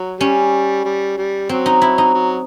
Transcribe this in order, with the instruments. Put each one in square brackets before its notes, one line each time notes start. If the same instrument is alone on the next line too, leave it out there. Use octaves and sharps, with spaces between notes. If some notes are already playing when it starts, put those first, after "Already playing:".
Already playing: [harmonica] F#3
[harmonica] G3 [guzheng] C#4
[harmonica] G3
G3
[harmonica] F#3 [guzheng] C4
[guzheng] D#4
E4
D#4
[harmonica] F#3